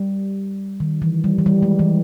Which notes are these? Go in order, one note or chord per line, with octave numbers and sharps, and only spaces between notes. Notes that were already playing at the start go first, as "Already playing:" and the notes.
Already playing: G3
D#3
E3
G3
E3
G3
G#3
E3